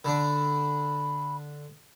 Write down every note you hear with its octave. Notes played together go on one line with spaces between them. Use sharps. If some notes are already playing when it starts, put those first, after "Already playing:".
D3 D4 B5